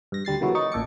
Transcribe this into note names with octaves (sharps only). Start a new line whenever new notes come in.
G2 A#6
D2 G3 A6 C7
A#2 C#3 E3 F#3 E4 F#4
D#4 C#6 A6
A1 A#2 A4 D6 C#7